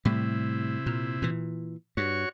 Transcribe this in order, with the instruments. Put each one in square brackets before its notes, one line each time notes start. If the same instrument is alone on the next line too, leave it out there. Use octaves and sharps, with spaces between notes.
[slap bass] A2 G3 [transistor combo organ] C3 E4
[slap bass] A#2
A#2 E3
[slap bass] G2 [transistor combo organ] F#4 C#5 C#6